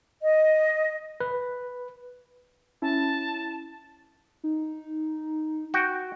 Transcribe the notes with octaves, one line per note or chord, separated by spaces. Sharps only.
D#5
B4
C#4 E4 A5
D#4
F#4 G5